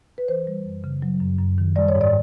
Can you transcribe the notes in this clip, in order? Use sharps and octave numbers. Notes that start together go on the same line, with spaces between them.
B4
E3 C5
G3
F#2
C#3
F#3
F#2
F#2
D#3
G3 D5
C#5
G#2
D5